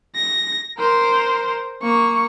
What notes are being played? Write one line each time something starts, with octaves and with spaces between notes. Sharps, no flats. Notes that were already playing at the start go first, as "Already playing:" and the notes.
A#6
A#4 C5
A#3 C#6